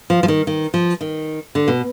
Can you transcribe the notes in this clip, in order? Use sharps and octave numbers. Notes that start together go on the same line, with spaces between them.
F3
F3
D#3
D#3
F3
D#3
D3
B2